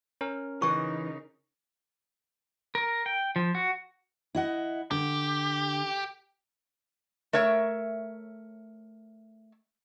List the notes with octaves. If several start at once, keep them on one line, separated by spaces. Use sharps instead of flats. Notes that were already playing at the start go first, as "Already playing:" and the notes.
C#4 A#4
C#3 E3 D#4 B4 C#6
A#4
G5
F3
F#4
E4 D#5 F#5
D3 G4
A3 A#4 C#5 E5